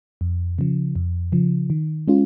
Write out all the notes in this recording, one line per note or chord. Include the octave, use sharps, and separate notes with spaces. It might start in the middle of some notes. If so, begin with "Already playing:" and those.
F2
C#3 F3
F2
C#3 F3
D#3
G#3 C#4 F4